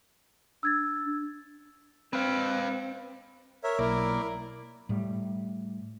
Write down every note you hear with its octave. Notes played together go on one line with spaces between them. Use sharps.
D4 E6 G#6 A6
C4 B4 F5
A#4 C#5 E5
B1 A#3 E4 A#4 D5
A2 G3